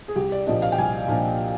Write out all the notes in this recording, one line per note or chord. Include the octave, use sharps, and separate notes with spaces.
G#4
C2 G4
D5
A#2 F3 A#3 D4 D#5
F5
G5
C2 G#5
A#2 F3 A#3 D4